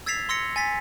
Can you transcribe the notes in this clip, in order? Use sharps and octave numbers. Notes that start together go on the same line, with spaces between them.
E6 G#6 A6 B6 C7 F7
C6 E6 A#6 C#7
G#5 A6 B6